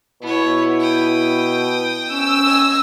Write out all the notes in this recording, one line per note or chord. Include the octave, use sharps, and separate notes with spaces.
B2 B3 E4 C#5
G5 D#6
C#4 E6
D#5 G#5